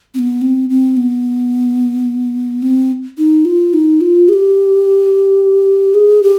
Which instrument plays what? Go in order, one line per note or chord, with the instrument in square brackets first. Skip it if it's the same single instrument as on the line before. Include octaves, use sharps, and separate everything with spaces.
[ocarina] C4
B3
C4
C4
B3
C4
D#4
F4
D#4
F4
G#4
G4
G#4
G4